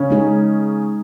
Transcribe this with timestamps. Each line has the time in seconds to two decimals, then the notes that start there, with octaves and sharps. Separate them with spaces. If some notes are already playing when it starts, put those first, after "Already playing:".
Already playing: C#3 C#4
0.10 G#3 D#4 G#4